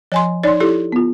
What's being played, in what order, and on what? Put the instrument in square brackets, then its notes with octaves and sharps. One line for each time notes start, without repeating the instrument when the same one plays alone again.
[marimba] F3 [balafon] C#5 G#5 C6
[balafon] D#4 C#5 [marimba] D5 C6
[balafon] E4 G4 A4
[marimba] B3 F4